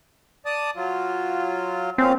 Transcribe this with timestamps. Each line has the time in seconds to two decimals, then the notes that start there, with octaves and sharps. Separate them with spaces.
0.46 D5 A5 D#6
0.76 F#3 F4
1.98 A#2 C4 C#4 F5